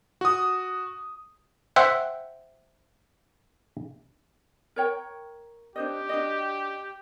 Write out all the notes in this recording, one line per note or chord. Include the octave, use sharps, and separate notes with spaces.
F#4 D#6
C5 E5 F#5 G5
A#4 C#5 G5
D4 G4 C5 D#5
D4 F#4 D#5